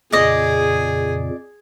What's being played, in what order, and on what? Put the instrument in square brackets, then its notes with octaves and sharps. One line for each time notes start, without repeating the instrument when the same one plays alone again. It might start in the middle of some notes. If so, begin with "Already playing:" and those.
[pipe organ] F2 A#2 C#3 [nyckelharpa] G#4 [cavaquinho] D5 D#5